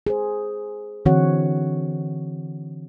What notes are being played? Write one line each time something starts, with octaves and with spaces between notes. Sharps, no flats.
G#4 C5
D3 E3 C4 F#4 C#5 F#5